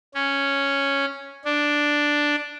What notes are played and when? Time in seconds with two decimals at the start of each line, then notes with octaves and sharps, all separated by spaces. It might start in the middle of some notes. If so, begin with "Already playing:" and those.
0.14 C#4
1.45 D4